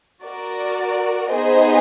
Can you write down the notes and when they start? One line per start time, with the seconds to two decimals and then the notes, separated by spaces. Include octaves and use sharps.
0.24 F#4 A#4 D5
1.32 B3 D#4 G#4 C5 D#5